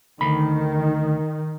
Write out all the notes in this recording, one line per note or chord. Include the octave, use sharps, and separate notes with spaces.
D2 D#3 B5